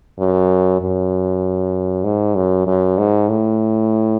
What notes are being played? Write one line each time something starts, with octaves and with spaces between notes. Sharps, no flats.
F#2
F#2
G#2
F#2
F#2
G#2
A2